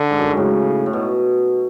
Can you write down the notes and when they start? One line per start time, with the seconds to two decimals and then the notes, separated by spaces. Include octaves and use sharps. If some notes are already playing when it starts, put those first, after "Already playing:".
Already playing: D3
0.10 G#2
0.19 F#2
0.28 G#2
0.37 A2 C#3
0.86 A2
0.93 B2